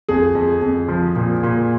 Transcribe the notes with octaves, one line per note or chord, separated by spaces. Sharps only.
F2 G#4
F2
F2
F3
A#2
A#2